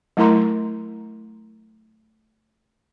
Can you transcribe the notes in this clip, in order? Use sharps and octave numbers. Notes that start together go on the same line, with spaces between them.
F#3 A3 E4 A#4 A#5 C6